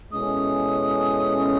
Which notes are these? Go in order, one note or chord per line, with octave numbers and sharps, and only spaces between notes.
B2 G#3 C#4 E4 A4 D#6